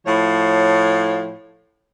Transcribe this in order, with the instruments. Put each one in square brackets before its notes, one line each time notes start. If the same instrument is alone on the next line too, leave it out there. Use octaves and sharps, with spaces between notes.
[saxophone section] A2 F3 C#5